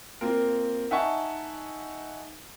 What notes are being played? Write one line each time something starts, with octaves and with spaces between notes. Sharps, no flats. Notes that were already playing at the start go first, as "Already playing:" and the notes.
A#3 C4 F4 A#4
D#4 E5 F#5 G#5 A5 C#6